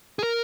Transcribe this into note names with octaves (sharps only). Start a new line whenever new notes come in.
G#4
A#4